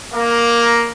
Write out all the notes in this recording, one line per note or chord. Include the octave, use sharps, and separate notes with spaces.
A#3